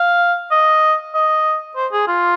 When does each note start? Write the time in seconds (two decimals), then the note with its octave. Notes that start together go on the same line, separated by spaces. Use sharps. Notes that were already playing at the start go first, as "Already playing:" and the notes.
Already playing: F5
0.51 D#5
1.15 D#5
1.76 C5
1.93 G#4
2.08 F4